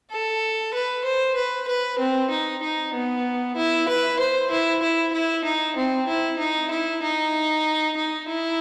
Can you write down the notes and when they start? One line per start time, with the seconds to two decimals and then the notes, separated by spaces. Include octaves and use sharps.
0.10 A4
0.73 B4
1.04 C5
1.36 B4
1.68 B4
1.99 C4
2.30 D#4
2.62 D#4
2.94 B3
3.56 E4
3.88 B4
4.19 C5
4.51 E4
4.82 E4
5.13 E4
5.44 D#4
5.76 C4
6.08 E4
6.39 D#4
6.70 E4
7.03 D#4
7.96 D#4
8.27 E4